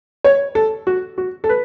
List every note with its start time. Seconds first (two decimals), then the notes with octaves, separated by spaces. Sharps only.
0.24 C#5
0.55 A4
0.87 F#4
1.18 F#4
1.44 A4
1.49 B4